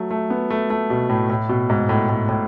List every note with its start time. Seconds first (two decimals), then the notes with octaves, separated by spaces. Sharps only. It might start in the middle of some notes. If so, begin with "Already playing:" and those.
Already playing: F#3 A3
0.11 A3
0.30 B3
0.50 A3
0.70 A3
0.90 B2
1.09 A2
1.30 A2
1.49 B2
1.70 G#2
1.89 A2
2.09 A2
2.29 A2